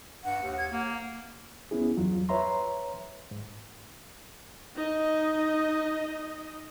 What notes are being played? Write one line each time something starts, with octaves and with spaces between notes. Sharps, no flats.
G2 F#5
D#2
G#6
A#3 F#5
C#2 B3 C#4 E4 G#4
E2 G2 F#3 F4
B4 C#5 E5 A#5 C6
G#2
D#4 D#5